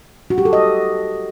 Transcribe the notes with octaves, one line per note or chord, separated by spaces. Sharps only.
F#4
G4
A4
D#5